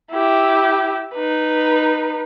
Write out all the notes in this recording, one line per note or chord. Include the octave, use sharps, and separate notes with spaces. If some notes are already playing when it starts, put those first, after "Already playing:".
E4 G4
D#4 B4